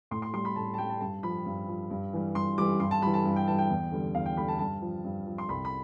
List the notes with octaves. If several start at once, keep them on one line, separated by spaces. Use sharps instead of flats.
A2 C6
C6
G3 C6
B5
A2 A5
A5
G3 G5
A5
G2 A5
F3 B5
G2
F3
G2
E3 G3
G2 C6
E3 G3 D6
G2 C6
A5
E3 G3 B5
A5
G2
G5
E3 G3 A5
G5
E2
D3 G3
E2 F5
G5
D3 G3 B5
A5
G2 A5
F3
G2
F3
C6
C2 B5
B5